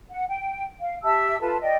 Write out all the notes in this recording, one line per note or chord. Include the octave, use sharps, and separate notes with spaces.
F#5
G5
F5
G4 E5 A5 E6
F4 A4 B4 A5
D5 D#5 G5